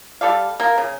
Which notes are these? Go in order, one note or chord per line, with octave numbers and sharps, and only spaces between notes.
G3 A4 D5 F5
A#3 A#4
C#3